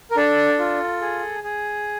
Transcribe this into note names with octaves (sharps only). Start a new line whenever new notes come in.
A#4
D4 A4
F4
G#4
G#4